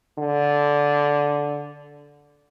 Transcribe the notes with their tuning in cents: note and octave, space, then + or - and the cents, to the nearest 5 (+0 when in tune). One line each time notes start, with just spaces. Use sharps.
D3 -10